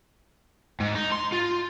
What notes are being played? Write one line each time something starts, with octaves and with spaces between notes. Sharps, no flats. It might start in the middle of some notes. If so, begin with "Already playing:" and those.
G#2
D#4
C6
F4